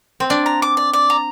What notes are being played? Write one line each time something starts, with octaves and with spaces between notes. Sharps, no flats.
C4
D4 D5
A#5
D6
D5
D5
A#5